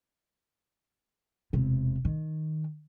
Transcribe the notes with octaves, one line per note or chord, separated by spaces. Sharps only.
E1 C3
D#3